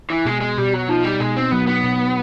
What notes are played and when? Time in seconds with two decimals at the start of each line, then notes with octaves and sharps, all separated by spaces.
0.10 E3
0.25 B2 G#3
0.41 G#3
0.58 B2 G3
0.74 F#3
0.89 F3 D#4
1.04 G3
1.20 B2 G#3
1.37 C4
1.51 F#3 B3
1.67 B3
1.83 B2